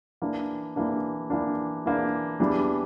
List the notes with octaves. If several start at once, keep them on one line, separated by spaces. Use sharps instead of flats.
E3 A#3 D4
E3 A#3 D4
E3 A#3 D4
E3 A#3 D4
E2 E3 G3 D4